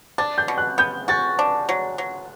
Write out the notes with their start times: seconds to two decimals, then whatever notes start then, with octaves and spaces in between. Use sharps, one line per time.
0.18 D4 A6
0.38 G6
0.48 B2
0.58 F#6
0.78 B3 G6
1.08 F#4 A6
1.39 D4
1.69 F#3
1.98 F#3